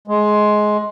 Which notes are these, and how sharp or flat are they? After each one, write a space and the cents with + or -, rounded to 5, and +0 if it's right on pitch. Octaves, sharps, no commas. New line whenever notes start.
G#3 +15